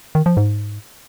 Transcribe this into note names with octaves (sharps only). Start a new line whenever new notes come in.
D#3
F3
G#2